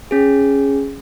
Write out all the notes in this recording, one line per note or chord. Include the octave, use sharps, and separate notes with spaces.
C#4 G#4